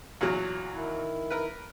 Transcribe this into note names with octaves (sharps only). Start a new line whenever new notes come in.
E2 A#2 F#3
D#3 E4
A#4 B4